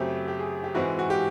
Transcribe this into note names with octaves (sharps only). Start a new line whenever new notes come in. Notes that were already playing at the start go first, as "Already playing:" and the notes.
Already playing: F#2 C#3 F#3 A3 C4 G4
G4
G#4
G4
G#2 E3 G#3 C4 F#4
F#4
G4